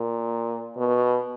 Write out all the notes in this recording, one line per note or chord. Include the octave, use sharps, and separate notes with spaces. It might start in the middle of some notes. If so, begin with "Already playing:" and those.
Already playing: A#2
B2